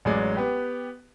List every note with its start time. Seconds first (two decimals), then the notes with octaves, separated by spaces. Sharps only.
0.05 A1 F#3 G#3 D5
0.36 B3 G4 B4